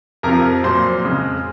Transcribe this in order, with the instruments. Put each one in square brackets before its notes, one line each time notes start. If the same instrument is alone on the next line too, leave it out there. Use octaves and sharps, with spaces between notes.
[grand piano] F2 C3 F3 A#4 A#5
A#2 F#3 C5 C6
F2 C#3 G#3